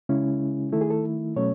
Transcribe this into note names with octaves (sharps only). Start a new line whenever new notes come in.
C#3 G#3 C#4 E4
D#3 A3 E4 A4
G#4
A4
B2 F#3 A3 C#4 C#5